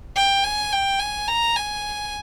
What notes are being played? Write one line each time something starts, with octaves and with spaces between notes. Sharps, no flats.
G5
G#5
G5
G#5
A#5
G#5